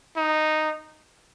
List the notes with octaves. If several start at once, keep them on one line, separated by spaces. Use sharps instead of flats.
D#4